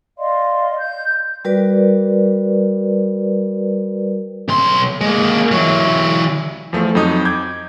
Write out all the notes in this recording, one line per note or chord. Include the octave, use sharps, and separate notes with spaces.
D5 D#5 F5 C6
G6
G3 F#4 A#4 B4 D5
B1 C6
G#3 A#3
E3 F#3
E2 F3 A3
F2 F#3 D#4 D#6
D6 G6 G#6